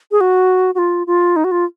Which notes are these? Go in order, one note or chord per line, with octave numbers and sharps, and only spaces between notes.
G#4
F#4
F#4
F4
F4
D#4
F#4
F4